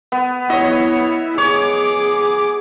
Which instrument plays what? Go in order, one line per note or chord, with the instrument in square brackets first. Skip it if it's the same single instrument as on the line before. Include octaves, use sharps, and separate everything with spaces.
[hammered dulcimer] B3
[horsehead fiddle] B3 C#5 [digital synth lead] E4 [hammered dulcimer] D#5
[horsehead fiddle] G#4 [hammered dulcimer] C#5 [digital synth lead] D6